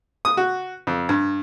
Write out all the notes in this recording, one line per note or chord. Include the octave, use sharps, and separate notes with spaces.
D#6
F#4
F2
G2